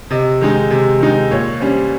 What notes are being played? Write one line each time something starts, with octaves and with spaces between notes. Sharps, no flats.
C3 D#5
D#3 G#3 D#4
C3
D#3 G#3 D#4
A#2 C#5
G3 C#4 C5